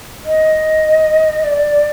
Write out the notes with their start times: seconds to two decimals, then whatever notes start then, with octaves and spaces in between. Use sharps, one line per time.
0.24 D#5
1.43 D5